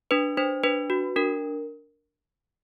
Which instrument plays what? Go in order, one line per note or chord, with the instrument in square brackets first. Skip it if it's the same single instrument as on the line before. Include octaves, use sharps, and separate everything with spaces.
[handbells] D4 B4
D4 C5
D4 B4
F#4
D4 A#4